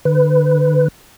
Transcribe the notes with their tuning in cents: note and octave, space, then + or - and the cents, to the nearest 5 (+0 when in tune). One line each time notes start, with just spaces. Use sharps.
D3 +30 B4 +20